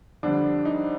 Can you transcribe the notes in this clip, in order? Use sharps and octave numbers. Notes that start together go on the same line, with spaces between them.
F2 D3 G3 D4
D#4